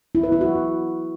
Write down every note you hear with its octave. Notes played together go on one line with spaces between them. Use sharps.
E4
B4
E4
F#4